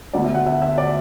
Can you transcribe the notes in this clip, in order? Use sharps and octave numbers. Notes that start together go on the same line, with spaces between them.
D2 D3 B3 D5
E5
F#5
E5
E5
D5